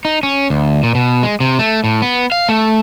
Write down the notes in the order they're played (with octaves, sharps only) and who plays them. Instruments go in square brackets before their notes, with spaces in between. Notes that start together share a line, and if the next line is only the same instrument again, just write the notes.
[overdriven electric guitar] D#4
C#4
D2
A#2
B2
G#3
C3
A3
A2
B3
F5
A3